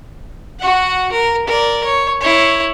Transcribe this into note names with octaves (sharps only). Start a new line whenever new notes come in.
F#4 F#5
A#4
A#4 D5
C#5
E4 C#5